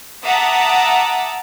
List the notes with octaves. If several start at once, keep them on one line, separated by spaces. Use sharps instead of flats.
E5 F#5 A5 A#5 D6 D#6